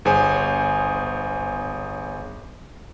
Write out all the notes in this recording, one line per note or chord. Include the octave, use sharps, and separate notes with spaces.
G1 G#4 C5 C#5 G#5